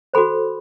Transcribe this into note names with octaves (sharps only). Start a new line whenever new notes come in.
F#4 A4 C5 B5